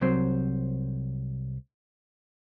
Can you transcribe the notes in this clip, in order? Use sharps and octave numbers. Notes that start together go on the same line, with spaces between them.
C2 F#3 C4 C5